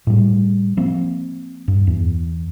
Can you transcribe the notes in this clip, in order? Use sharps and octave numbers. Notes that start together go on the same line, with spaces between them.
A2 G3
F3 A#3 C4
G2
E2